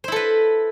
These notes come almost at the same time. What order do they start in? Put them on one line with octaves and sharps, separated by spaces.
C5 E4 A4 B4